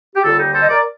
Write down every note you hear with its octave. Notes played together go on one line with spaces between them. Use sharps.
G4
D#2 D3 G3 F4 A4
D#4 G4
A4 C5
D#5
A#4 D5